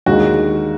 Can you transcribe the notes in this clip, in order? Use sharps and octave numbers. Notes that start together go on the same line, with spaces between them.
D#2 D3 G#3 F#4